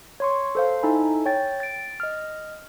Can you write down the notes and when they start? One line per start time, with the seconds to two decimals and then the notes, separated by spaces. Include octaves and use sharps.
0.20 C#5 C6 C#6
0.55 A4 C5 F5
0.83 D#4 E4 A4 G#5 B5
1.26 C#5 G5 A6
1.60 A6 D7
2.00 D#5 F6